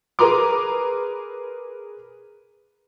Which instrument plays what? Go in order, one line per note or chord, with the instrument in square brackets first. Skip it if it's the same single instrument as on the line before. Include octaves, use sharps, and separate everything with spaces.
[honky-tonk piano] G#4 A#4 B4 A#5 C6 D6